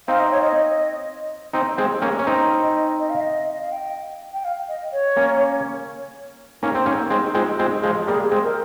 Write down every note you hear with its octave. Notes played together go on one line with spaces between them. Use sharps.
C4 D#4 F5
D#5
C#5
D#5
C4 D#4
G#3 C4
A#3 C#4
C#4
C4 D#4
D#5
D#5
F5
D#5
D#5
F5
G5
G5
F5
D#5
C#5
A#3 C#4
A#3 C#4 D#4
C4
A#3 C#4
G#3 C4
D#4
G#3 C4 F4
G#3 C4
F3 G#3
G3 A#3 G#4
G#3 C4
A#4